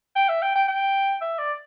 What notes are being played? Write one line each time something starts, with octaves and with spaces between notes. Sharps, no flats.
G5
E5
G5
G5
G5
E5
D5